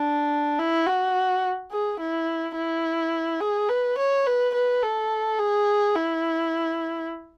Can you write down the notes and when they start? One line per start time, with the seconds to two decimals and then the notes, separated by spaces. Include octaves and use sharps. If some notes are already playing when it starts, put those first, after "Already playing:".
Already playing: D4
0.59 E4
0.87 F#4
1.71 G#4
2.00 E4
2.56 E4
3.41 G#4
3.69 B4
3.98 C#5
4.26 B4
4.54 B4
4.83 A4
5.39 G#4
5.95 E4